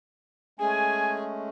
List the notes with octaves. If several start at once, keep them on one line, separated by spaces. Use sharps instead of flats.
G#3 A3 C#4 G#4 G#5